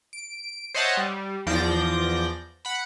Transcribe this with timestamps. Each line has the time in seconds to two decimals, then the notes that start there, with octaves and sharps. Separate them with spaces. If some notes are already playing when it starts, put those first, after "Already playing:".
0.13 D7
0.74 C5 C#5 D#5 E5 F#5 A5
0.97 G3
1.46 E2 F3 D5 G6 A#6
2.65 F#5 B5